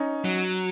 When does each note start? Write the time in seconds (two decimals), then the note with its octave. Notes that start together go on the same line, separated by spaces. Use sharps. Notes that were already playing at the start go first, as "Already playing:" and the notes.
Already playing: C#4 D#4
0.25 F#3